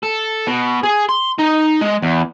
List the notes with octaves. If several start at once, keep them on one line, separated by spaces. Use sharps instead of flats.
A4
B2
G#4
C6
D#4
G#3
E2